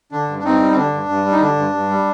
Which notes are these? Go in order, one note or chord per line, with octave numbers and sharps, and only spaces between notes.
D3 D4
G2
D4
G2 C4 D#4
G3
C4
D3 D4
G2
G2
G3
D#4
D3 D4
G2
G2
G3